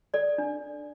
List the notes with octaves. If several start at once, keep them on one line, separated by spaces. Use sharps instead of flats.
A4 D5
D4